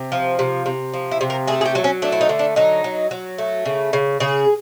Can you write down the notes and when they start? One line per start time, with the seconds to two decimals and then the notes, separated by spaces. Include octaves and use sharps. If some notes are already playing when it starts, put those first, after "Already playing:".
Already playing: C3
0.12 F3
0.39 C3
0.66 C3
0.94 F3
1.11 E4
1.21 C3
1.30 A#4
1.47 A3 G#4
1.61 G#4
1.66 G4
1.75 F#3
1.84 C#4
2.02 A3 D4
2.12 E4
2.21 D#4
2.29 D3
2.39 D4
2.56 F#3 D#4
2.84 F#3
3.11 F#3
3.38 A3
3.66 C#3
3.93 C#3
4.20 C#3 G#4